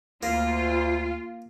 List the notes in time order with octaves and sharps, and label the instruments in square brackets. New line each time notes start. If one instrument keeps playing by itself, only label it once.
[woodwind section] D2 [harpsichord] A#3 [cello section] F4